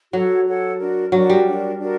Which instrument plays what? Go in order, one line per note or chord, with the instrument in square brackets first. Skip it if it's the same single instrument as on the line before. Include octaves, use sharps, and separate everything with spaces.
[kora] F#3 [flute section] F#4 A4 C#5 F#5
[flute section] F#4 A4 C#5 F#5
D4 F#4 A#4
[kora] F#3 [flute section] D4 F#4 A#4
[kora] G3
[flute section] D4 F#4 A#4
D4 F#4 A#4